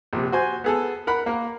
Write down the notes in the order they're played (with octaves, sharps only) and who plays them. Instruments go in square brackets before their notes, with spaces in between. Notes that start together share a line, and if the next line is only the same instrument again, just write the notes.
[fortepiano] A#1 C3
F#4 C5 G#5
B3 G#4 A4
A#4 F#5 B5
A#3 A#4